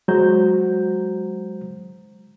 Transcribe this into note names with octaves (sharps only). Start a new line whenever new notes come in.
F#3 G#3 F#4 C5 A#5 G6